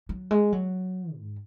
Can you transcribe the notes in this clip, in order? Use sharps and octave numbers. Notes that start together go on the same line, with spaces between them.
F#3
G#3
F#3
G#2